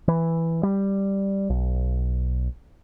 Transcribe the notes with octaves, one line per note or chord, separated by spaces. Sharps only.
E3
G3
B1